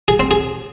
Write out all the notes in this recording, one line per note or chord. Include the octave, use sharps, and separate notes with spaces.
G#4
C4
G#4